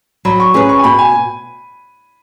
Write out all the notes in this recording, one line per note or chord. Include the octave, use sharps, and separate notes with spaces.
F#3 B5
C#6
C#4 G#4 B4
C#6
G#5
B2 B5
G#5